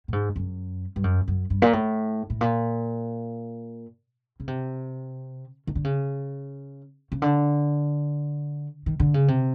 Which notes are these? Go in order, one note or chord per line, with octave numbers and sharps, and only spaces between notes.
A2
G#2
F#2
G2
F#2
F#2
G2
A#2
A2
A2
A#2
C#3
C3
D#3
D3
C#3
C#3
D3
D#3
D3
C#3
C3